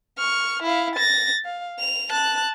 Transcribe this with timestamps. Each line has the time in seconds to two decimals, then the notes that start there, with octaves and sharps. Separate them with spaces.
0.18 C#6 F6
0.63 E4 F5
0.96 A6 A#6
1.45 F5
1.79 F7
2.11 A5 F#6